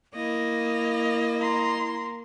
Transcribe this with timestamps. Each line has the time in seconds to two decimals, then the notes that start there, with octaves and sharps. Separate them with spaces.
0.15 A#3 E4 D#5
1.41 A#5 C6